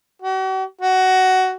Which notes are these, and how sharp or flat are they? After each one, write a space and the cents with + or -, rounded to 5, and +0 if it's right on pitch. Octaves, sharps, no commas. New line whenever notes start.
F#4 +45
F#4 +15